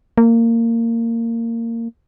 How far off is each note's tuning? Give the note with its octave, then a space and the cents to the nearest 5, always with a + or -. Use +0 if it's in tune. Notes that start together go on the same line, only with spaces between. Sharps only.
A#3 -20